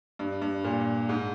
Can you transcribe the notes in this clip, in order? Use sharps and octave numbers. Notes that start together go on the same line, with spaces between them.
G2
G2
A#2
G#2